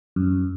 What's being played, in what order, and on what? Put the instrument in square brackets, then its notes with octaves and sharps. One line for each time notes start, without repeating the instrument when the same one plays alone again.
[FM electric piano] F#2